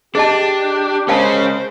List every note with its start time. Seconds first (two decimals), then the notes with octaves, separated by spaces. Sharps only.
0.15 D4 G4 G#4 D#5 A5
1.08 G#3 C#4 G#4 A#4 C5 F5 A5